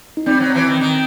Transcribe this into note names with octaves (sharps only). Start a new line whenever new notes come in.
D#4
G3 C4
F#3
E3
D#3
D#3